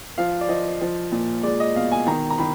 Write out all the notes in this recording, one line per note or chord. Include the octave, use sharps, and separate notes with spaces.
F3 F5
D5
F3 D#5
F3
A#2
G#3 D5
D#5
B2 F5
G#5
D#3 A#5
A#5
D#3 B5